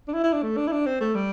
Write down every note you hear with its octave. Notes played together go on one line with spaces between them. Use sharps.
D4
E4
E4
D4
A3
D4
E4
D4
C4
A3
G3